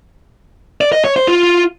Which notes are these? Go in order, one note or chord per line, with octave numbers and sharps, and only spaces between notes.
D5
D#5
C#5
C5
F4